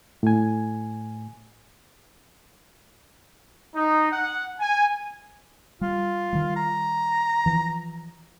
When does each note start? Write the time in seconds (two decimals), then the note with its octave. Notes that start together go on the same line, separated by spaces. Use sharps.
0.23 A2 G#5
3.74 D#4
4.11 F#5
4.59 G#5
5.81 G3 F4
6.33 D#3 G3
6.56 A#5
7.46 E3 F3